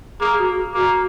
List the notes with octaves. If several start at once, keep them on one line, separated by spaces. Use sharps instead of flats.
A#3 G#4
F#4
A#3 F#4